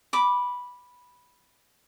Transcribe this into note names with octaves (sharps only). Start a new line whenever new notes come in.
B5 D6